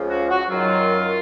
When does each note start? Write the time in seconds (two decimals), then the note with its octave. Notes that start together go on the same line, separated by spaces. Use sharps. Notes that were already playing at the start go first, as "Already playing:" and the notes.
Already playing: C#2 C#3 F3
0.10 F#4
0.30 F#4
0.49 F#2 D#3 F#3 F4